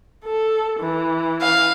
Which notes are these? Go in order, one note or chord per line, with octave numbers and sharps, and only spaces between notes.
A4
E3
F5